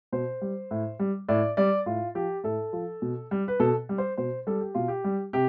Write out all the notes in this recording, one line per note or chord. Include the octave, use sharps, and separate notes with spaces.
B2 C5
G3
A2
G3
A2 D5
G3 D5
A2 F4
F3 G4
A2 A4
F3
B2
G3
B4
B2 A4
G3
C5
B2 C5
G3 A4
G4
B2 F4
G4
G3
C3 G4